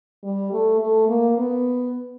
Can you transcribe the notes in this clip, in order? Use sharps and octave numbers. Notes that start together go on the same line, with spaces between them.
G3
A3
A3
A#3
B3